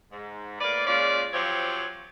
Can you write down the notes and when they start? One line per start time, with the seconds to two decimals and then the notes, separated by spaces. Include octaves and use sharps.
0.12 G#2
0.61 A2 A#3 B4 D5
0.87 A#2 G#3 C#4 F4 D5
1.33 F3 F#3 C4 G4 C#5